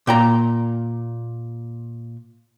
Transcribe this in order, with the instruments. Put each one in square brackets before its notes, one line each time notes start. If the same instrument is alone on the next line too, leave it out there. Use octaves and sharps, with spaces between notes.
[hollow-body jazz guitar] A#2 G5 A#5